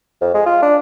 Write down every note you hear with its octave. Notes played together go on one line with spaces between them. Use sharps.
F2
G#3
F4
D4